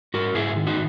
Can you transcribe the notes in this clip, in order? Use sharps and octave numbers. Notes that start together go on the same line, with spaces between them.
G#2 F#4 A#4
G#2 E4 G#4
D#3
D#4 F#4